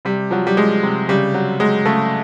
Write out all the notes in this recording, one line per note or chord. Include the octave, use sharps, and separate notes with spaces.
C3 G3
F3 F#3
G3
F3 G#3
C3
C#3 G3
F#3
F#3 G#3
C#3 A3